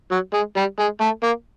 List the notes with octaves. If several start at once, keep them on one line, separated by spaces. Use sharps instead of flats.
F#3
G#3
G3
G#3
A3
A#3